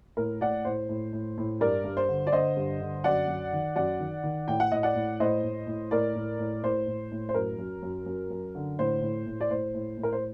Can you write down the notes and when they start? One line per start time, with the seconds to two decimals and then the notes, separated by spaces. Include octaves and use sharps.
0.17 A2 A#4
0.41 A2 D5 F#5
0.65 A2 C5
0.89 A2
1.13 A2
1.38 A2
1.60 G2 A#4 D5
1.84 G2
1.97 C5
2.08 D3
2.27 D5
2.32 D3 C5 D#5
2.57 G2
2.80 D3
3.04 F#2 D5 F#5
3.28 F#2
3.53 D#3
3.76 F#2 D5 F#5
4.00 D#3
4.24 D#3
4.48 A2 G5
4.60 F#5
4.72 A2 D#5
4.83 D5 F#5
4.95 A2
5.20 A2 C5 D#5
5.44 A2
5.67 A2
5.91 A2 A#4 D5
6.15 A2
6.39 A2
6.63 A2 C5
6.87 A2
7.12 A2
7.29 C5
7.34 F#2 A#4
7.59 F#2
7.83 F#2
8.06 F#2
8.30 F#2
8.55 D3
8.79 A2 C5
9.02 A2
9.27 A2
9.41 D5
9.51 A2 C5
9.75 A2
9.98 A2
10.03 A#4
10.13 C5